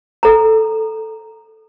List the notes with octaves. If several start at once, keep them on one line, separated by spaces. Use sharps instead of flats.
A4 A#5